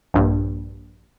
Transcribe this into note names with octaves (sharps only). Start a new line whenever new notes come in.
A#1 G2